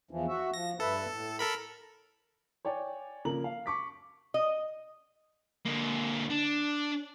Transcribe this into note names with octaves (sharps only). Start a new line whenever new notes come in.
E2 E3 F3
F#4 E5
F3 A#6
G2 A4 B4 E5
A2
A4 A#4 B5
C#5 D5 G5 G#5
C#3 F3 A#3 A#5 F#7
F5
C#6 D6 B6
D#5
D3 A#3
D4